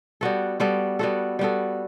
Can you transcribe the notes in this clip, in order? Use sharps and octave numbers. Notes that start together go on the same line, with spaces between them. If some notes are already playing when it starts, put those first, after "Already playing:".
G3 B3 F#4 A4
G3 B3 F#4 A4
G3 B3 F#4 A4
G3 B3 F#4 A4